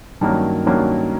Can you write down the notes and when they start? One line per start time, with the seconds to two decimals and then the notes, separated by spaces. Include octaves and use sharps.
0.21 G2 D#3 F#3 A#3 C#4
0.66 G2 D#3 F#3 A#3 C#4